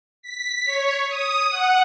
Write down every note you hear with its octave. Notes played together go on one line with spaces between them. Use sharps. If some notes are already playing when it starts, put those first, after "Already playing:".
B6
C#5
D#6
F#5